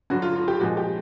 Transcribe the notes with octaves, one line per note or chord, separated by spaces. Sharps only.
G2 D3 F#3 F#4
F4
F4
G4
A#2 F3 G#3 F#4
G4